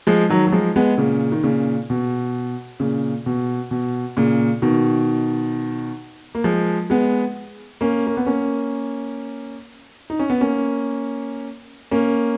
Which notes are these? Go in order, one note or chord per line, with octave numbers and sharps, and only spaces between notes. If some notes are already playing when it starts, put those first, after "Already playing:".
F3 G#3
D#3 F#3
F#3
F3 G#3
G#3 B3
A#2 C#3
D#3
A#2 C#3
B2
A#2 C#3
B2
B2
A#2 C#3
B2 D#3
A#3
F3 G#3
G#3 B3
A#3 C#4
A#3
B3
A#3 C#4
D#4
C#4
B3
A#3 C#4
A#3 C#4